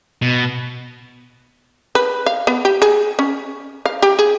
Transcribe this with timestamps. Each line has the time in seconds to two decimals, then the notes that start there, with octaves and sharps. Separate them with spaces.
0.22 B2
1.95 B4
2.26 F5
2.47 B3
2.65 G4
2.82 G#4
3.19 C#4
3.86 F5
4.02 G4
4.19 G#4